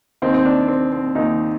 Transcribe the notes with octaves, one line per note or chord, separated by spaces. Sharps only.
D#2 D#3 C4
C4
D4
C4
C4
D#2 D#3 D#4